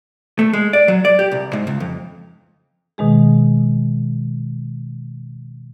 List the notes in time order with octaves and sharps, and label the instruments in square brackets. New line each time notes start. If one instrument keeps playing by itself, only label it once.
[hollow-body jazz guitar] A3
G#3
D5
F#3
D5
G4
C2
G#2
C#2
F2
[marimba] B2 D#3 G#3 G#4